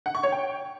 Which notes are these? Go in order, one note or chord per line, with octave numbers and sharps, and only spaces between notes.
F#5
C#6
C#5
G5